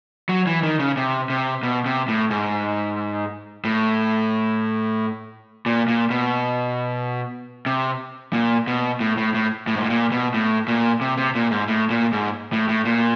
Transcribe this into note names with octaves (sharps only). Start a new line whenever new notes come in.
F#3
E3
D#3
C#3
C3
C3
B2
C3
A2
G#2
A2
A#2
A#2
B2
C3
A#2
B2
A2
A2
A2
A2
G#2
A2
A#2
B2
A2
A#2
C3
C3
A#2
G#2
A2
A#2
G#2
A2
A2
A#2